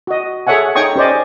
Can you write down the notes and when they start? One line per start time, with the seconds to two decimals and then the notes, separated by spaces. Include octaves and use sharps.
0.07 F#4 D#5
0.47 G#4 A4 C#5 E5 F#5 G#5
0.75 D#4 C#5 G5 C#6 D#6
0.96 C#4 G4 C5 D5 D#5